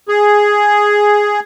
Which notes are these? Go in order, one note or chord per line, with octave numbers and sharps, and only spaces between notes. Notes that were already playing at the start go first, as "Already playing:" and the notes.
G#4